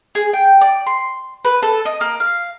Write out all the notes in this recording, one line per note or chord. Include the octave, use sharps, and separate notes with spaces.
G#4
G5
D5
C6
B4
A4
D#5
A#3
F5